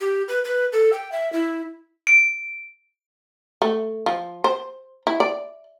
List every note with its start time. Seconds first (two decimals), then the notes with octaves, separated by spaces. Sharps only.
0.01 G4
0.28 B4
0.45 B4
0.73 A4
0.93 G5
1.12 E5
1.33 E4
2.07 D7
3.62 A3
4.06 F3
4.44 C5
5.07 E4
5.20 D5